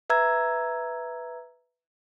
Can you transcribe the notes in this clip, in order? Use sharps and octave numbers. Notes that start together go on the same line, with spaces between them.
B4 E5 A#5 E6 G#6